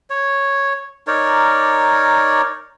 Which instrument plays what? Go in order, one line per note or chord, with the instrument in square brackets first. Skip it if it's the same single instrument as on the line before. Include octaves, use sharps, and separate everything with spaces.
[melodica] C#5
D#4 A#4 C#5 D5